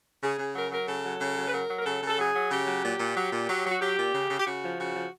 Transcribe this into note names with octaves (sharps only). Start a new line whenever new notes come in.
C#3 G#4
C#3
F#3 A#4
F#3 A#4
C#3 A4
F#3
C#3
F#3
B4
F#3 A#4
F#3
A#4
C#3 A4
C#3
A4
F#3 G#4
F#3
C#3 G4
F#3
A#2
A#2
F#3
A#2
F#3
F#3 F#4
F#3 G4
A#2
C#3
C#3
G4
C#3 F#4
F3
C#3 F#4
F3